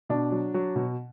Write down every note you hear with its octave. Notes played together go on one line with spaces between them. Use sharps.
B2 D4
F#3
F#3
B2